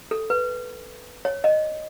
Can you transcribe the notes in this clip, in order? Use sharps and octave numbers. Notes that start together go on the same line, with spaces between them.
A4
B4
C#5
D#5